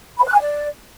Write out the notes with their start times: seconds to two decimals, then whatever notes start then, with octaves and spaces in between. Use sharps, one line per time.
0.17 B5
0.23 C5
0.28 F#6
0.34 G#5
0.39 D5